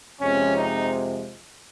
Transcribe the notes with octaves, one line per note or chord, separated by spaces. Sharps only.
F2 C3 F3 G#3 C#4
D#4